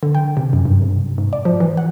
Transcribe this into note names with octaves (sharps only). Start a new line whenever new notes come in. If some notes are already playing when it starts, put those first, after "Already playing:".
D3
G5
C3
F#2
G2
C3
G#2
D5
F3
E3
F#5